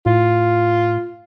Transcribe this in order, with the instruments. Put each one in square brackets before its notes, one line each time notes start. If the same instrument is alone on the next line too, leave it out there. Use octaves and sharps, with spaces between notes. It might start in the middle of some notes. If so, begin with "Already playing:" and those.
[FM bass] A2 [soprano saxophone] F4